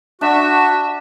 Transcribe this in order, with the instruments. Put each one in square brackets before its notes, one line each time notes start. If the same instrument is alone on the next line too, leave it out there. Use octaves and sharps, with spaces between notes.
[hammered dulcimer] D4 [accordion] F#4 [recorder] E5